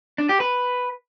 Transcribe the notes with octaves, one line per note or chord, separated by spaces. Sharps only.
D4
G4
B4